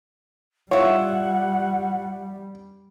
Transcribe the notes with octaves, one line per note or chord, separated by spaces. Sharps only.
G3 E4 F4 C#5 F#5